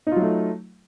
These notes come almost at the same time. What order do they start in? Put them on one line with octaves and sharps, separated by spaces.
D#4 F4 F#3 A3